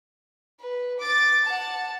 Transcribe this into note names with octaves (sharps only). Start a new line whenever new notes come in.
B4
D6 A6
F#5 A5